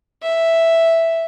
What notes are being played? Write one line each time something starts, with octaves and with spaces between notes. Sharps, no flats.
E5